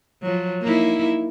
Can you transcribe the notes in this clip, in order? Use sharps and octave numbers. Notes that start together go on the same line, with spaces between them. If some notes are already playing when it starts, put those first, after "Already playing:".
F3 F#3
A#3 D#4 E4